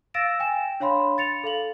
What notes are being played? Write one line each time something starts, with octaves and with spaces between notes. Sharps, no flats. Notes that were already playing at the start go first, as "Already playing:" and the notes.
F5 E6 A6 A#6 D7 E7
G5 G#5 E7
D4 C#5 F5 B5 C6
A6 C#7 F7
A4 F5 F#7